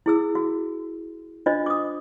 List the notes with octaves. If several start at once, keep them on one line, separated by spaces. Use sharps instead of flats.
E4 G#4 E6
F#4
D4 F4 C5 D#5
D6 D#6